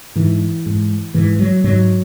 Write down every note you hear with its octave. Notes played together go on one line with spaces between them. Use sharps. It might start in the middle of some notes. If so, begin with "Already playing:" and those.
G#2 E3
G#2
G#2 E3
F#3
G#2 F#3